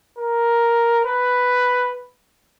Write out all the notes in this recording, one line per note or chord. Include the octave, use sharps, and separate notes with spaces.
A#4
B4